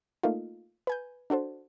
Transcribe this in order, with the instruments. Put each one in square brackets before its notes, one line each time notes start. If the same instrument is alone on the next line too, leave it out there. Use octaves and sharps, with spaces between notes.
[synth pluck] A3 A#3 D#4 F4
B4 G#5 G6
D4 F#4 A4 C5